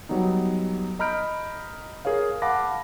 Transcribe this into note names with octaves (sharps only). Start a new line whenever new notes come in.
F#3 G3 B3 D#4
D#5 A#5 B5 F6 G6 D7
G#4 A#4 C#5 F5
F5 F#5 A5 B5 D6 A#6